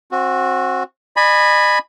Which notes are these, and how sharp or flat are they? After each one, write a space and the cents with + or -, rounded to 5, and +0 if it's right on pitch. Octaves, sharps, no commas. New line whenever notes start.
C4 +25 F#4 -15
D#5 -45 G#5 +0 B5 +0